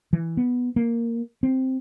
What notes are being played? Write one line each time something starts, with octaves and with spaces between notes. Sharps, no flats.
E3
B3
A#3
C4